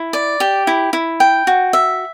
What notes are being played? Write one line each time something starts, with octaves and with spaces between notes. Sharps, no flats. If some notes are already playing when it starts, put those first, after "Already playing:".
Already playing: E4
D5
G4
E4
E4
G5
F#4
E5